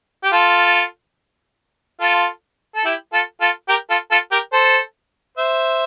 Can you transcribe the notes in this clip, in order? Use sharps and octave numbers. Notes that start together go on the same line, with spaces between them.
G4
F4 A4
F4 A4
A4
E4 G4
F4 A4
F4 A4
G4 A#4
F4 A4
F4 A4
G4 A#4
A4 C5
C5 E5